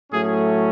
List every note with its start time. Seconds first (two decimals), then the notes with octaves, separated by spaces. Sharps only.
0.12 A2 F#3 A3 C#4 G#4